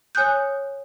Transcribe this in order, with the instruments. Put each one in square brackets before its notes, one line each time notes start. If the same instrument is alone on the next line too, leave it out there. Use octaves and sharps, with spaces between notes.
[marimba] C#5 G#5 D#6 F#6 G6